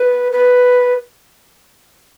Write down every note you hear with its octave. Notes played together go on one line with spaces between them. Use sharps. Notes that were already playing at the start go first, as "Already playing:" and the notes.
Already playing: B4
B4